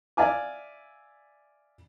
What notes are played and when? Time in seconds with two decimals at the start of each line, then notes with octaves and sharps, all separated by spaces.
0.17 D5 E5 F5 G#5 D6